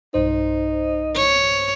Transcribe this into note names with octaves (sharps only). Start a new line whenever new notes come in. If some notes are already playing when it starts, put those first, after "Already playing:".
B1 G2 D#4 C5
C#5